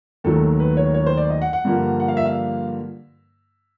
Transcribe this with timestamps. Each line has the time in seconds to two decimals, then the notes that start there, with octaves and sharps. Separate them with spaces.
0.24 D#2 D#3 F#3 A3 A4
0.60 B4
0.77 C#5
0.94 C#5
1.06 C5
1.17 D5
1.30 D#5
1.42 F#5
1.53 F#5
1.65 G2 D3 F3 A#3
2.00 F#5
2.08 F5
2.17 E5
2.26 F5